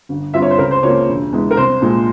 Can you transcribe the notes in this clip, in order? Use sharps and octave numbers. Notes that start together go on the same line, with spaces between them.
G1
G2 F3 C4 F4 E5
C#5
C5
C#2 A#4
C5
C#3 F3 A#3 C#5
E1
E2 E3 G#3
A#4
C2 C5
A#2 F3 G#3